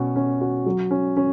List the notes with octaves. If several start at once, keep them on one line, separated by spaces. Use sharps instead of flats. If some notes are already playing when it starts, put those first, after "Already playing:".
Already playing: B2 C#4 F#4
C#4
F#4
F#3
C#4
C#4